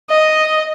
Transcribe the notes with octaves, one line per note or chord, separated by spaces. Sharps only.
D#5